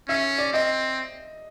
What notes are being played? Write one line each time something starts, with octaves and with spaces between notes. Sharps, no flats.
C#4 E5
D5
C4 D#5